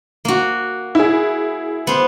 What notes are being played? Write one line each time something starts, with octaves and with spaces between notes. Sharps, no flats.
A#3 F#4
E4 G#4
B3 C5